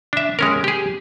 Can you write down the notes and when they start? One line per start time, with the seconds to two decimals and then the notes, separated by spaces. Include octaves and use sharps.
0.13 D4 E5
0.39 G#3 C#4 A#4
0.64 G4 G#4